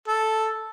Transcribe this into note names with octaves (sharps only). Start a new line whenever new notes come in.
A4